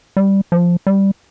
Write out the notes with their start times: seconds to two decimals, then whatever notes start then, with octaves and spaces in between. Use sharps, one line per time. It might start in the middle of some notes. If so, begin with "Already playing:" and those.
0.17 G3
0.52 F3
0.87 G3